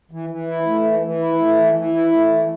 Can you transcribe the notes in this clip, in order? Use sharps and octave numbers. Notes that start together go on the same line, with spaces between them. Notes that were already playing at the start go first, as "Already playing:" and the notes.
E3
E3
E4
A3
E3
E3
E4
A3
E3
E3
E4
A3
E3